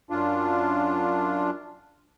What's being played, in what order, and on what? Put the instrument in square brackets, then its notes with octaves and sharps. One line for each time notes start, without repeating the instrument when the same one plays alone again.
[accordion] F#2 D4 F4